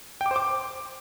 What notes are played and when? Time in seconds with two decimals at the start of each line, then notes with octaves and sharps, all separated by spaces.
0.21 G5
0.26 D6
0.31 C5
0.36 D6